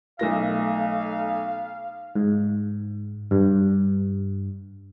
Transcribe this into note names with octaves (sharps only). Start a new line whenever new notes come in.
B1 A3 F5 A#6
G#2
G2